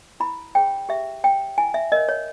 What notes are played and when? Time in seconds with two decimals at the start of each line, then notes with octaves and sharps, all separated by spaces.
0.20 E4 B5
0.55 G#4 C#5 G5
0.89 G4 E5
1.24 C#5 G5
1.58 E4 G#5
1.74 E5
1.92 A#4 C#5 D#5
2.09 C#5